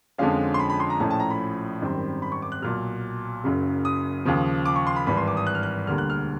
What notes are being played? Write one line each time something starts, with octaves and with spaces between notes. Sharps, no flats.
F2 D3 F3 G#3 C#4 F5
C6
B5
B5
C6
A#5
A#1 A2 F3 A3 C#4 A5
A5
A#5
B5
G#1 F#2 D#3 G3 C4
B5
C#6
D6
F#6
B1 A#2 F#3 F6
F#1 F#2 C#3 F#3
D#6
D#2 C#3 F3
D6
C#6
C6
B5
G#1 G2 E3 B5
C6
D6
D#6
F#6
F6
F#6
E1 D2 D3 G3 A#3 F6
F#6
F6